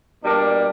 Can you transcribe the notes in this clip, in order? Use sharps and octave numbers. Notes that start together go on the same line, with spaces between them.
B2 G3 A#3 D4